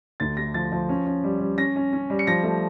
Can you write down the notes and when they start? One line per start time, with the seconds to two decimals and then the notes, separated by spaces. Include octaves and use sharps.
0.20 D2 A6
0.37 A3 A#6
0.54 F3 A6
0.72 F3
0.89 C#4
1.07 C#4
1.24 G3
1.40 G3
1.57 C#4 A#6
1.76 C#4
1.93 C#4
2.10 G3
2.19 C#7
2.27 F3 A#6
2.43 A3